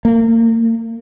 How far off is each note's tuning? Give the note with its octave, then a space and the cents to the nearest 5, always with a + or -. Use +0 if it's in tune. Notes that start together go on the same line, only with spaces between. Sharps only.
A#3 -35